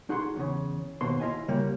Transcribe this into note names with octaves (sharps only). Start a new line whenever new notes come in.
D#4 F#4 G#4 F#5 C6
E2 C#3
D#2 B2 C5 C6
E4 F4 D#5 E5 G#5
C#3 G3 A#3 F#4 G4